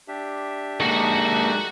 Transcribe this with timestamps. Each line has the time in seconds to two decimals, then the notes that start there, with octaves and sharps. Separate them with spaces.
0.08 D4 G4 E5
0.80 G#3 A#3 D#4 F#4 A4 F#5